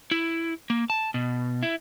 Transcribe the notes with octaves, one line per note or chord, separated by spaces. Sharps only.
E4
A#3
A5
B2
E4